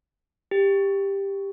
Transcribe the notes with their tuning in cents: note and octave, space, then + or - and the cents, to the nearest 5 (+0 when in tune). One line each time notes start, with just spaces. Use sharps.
G4 +10